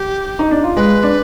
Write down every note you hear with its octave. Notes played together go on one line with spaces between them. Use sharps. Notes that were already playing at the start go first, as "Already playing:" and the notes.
Already playing: G4
D#4
D4
F4
G#3 B4
D4